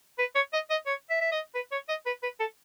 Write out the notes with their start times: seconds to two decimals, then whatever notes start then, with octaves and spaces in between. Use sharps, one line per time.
0.19 B4
0.35 C#5
0.53 D#5
0.70 D#5
0.87 C#5
1.10 E5
1.21 E5
1.32 D#5
1.55 B4
1.72 C#5
1.89 D#5
2.06 B4
2.23 B4
2.40 A4